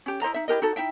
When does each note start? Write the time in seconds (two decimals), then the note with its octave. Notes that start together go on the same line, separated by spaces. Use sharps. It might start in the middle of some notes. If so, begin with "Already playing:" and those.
0.06 C#4 G4
0.21 E4 C5 D#5 A#5
0.34 D#4 E5
0.48 E4 G4 A#4 D#5
0.62 D#4 F#4 A4
0.76 D#4 E4 E5 G5